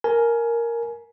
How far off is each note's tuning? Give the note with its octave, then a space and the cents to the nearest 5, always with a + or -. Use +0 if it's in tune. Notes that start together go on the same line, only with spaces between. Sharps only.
A#4 +0 G#5 +20